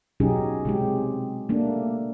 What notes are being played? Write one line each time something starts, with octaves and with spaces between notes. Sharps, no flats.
B2 F#3 C#4 D#4 G4 G#4
C3 G#3 G4
A3 A#3 D4